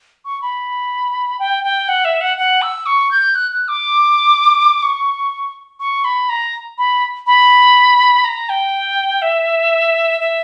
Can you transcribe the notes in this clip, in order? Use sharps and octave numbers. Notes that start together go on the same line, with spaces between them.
C#6
B5
G5
G5
F#5
E5
F#5
F#5
E6
C#6
G6
F#6
F#6
D6
C#6
C#6
B5
A#5
B5
B5
A#5
G5
E5
E5